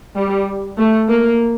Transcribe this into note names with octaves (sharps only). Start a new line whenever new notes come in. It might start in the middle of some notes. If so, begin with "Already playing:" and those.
G3
A3
A#3